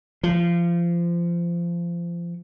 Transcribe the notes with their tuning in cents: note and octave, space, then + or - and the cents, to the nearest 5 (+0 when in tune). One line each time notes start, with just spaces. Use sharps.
F3 -25